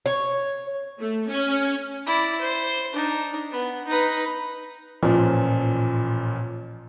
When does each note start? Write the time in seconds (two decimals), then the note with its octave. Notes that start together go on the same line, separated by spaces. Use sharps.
0.06 C#5
1.00 A3
1.30 C#4
2.06 E4 D5
2.41 C5
2.92 D4 D#4
3.51 B3
3.87 D#4 B4
5.03 A1 A#2 F3